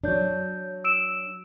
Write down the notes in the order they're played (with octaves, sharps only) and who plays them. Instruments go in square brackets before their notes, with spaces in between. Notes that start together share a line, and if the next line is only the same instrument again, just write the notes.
[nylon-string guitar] F#3 D4 [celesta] C#5 G6
[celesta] E6 D7 E7